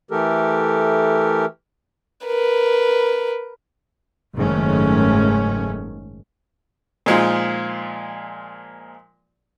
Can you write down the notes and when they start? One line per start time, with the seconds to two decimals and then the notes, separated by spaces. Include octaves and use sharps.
0.11 E3 A3 G4 A4 A#4
2.26 A#4 B4
4.35 F#1 G#2 D#3 A3 C#4
7.06 A#2 F3 G#3 D#4 F4